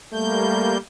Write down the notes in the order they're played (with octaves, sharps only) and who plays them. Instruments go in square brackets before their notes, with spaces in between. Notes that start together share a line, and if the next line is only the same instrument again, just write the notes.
[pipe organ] G3 A#3 G6 [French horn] A3